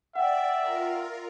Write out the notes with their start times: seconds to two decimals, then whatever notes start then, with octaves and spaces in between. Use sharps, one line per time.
0.16 D5 E5 F#5 G5
0.60 F4 A#4